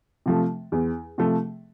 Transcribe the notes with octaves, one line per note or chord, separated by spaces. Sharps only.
C3 F3 A3
E2
C3 F3 A3